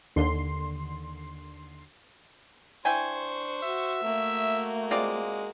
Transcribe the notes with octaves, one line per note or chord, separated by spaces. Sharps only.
D#2 D3 C6 C7
D4 E4 C5 G5 G#5 C#6
F#4 E5
A3 A#3 F#4
G#3 C4 F4 D5